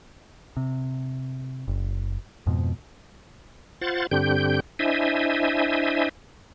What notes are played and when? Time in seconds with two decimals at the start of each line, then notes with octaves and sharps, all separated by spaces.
0.57 C3
1.68 F#1
2.47 F2 G#2 B2
3.81 F4 C5 F#5 A6
4.11 G2 D3 C4 G4 G6
4.79 D4 E4 C5 D#5 E5 G#5